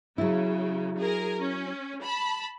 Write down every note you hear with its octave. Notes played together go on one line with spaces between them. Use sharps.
C#3 F#3 E4
G#4 A#4
C#4
A5 B5